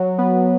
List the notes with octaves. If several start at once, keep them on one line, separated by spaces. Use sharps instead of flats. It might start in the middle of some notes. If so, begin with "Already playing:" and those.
Already playing: F#3
B3